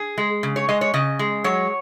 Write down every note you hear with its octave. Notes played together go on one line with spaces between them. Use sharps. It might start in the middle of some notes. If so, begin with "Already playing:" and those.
Already playing: G#4
G#3
C#3
C#5
G#3 D#5
C#5
C#3 D#5
G#3
F#3 C#5